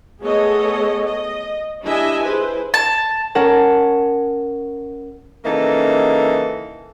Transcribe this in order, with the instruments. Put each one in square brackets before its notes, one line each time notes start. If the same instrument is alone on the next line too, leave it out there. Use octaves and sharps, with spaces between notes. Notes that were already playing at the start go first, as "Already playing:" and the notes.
[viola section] A3 B3 G#4 A4 C#5 D#5
D#5
D4 E4 G4 D#5 E5 G#5
E4 G#4 B4 C5
[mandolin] A5
[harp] C#4 A#4 F#5 A5
[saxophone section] C#3 E3 A#3 D#4 A4